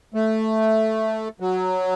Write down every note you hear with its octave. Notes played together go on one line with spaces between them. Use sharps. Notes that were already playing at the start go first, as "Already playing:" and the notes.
A3
F#3